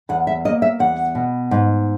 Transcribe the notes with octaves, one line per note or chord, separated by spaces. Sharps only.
E2 F#5
E5
A#3 D#5
E5
E2 F#5
B2
G#2